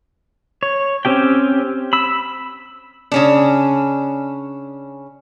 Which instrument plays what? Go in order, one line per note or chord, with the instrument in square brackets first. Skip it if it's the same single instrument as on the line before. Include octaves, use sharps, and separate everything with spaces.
[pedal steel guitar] C#5
C4 C#4 G4 G5
B5 E6
[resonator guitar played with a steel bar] C#3 C#4 D4